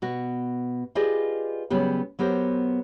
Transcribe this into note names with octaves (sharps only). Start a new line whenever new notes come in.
B2 F#4
F4 G4 G#4 B4 D5 D#5
C#3 F#3 G3 B3 G4
F#3 B3 G4 A#4 C5